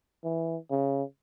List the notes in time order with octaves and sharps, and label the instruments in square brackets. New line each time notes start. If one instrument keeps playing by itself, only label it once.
[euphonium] E3
C#3